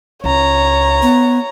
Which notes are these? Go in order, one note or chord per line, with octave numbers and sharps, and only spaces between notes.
C#2 C#5 A#5
B3